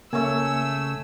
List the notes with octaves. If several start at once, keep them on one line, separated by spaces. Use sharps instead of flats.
C#3 A3 A#3 C#5 G#5 E6